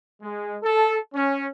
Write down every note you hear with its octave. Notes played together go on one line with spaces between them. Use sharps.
G#3
A4
C#4